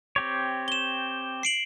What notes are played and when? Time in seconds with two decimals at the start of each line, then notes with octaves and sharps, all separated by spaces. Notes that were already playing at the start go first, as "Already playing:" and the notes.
0.16 C4 G4 C#5
0.68 E7 G7
1.43 C7 D7 F#7